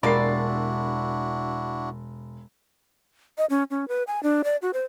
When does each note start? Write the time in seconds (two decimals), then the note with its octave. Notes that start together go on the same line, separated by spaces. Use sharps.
0.03 E1 G3 A#3 D4 E4 F#4 D5 C7
3.38 D#5
3.50 C#4
3.71 C#4
3.88 B4
4.07 G#5
4.23 D4
4.44 D5
4.62 F#4
4.73 C5